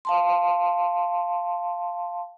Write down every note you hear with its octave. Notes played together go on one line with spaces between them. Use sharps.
F5 A5 C6